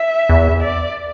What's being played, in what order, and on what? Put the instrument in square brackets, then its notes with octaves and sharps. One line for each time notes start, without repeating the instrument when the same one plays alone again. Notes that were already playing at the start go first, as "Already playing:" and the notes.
Already playing: [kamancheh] E5
[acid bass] E2
[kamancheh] D5